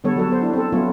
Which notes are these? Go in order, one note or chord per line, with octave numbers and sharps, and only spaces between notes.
D3 G3 B3 A4 C#5
F#3 F#4 A4
B3 C5
D4 E4
C4 A4
F#3 A3 B3 C#4 F4 C#5